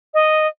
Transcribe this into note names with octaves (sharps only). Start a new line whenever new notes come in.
D#5